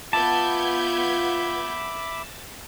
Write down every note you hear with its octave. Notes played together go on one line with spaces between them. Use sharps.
B3 F4 E5 A5 B5 D6 G6 G#6